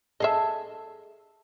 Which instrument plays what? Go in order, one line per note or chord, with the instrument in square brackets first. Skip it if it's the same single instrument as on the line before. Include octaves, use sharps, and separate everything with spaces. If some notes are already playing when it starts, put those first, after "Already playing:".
[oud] G#4 A4 [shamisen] D#5 E5